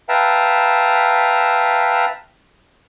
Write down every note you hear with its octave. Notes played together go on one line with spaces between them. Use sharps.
B4 E5 F5 G5 A5 A#5